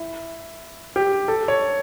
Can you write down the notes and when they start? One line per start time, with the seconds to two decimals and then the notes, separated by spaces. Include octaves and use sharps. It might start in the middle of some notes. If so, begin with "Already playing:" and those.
Already playing: E4
0.96 G4
1.28 A4
1.48 C#5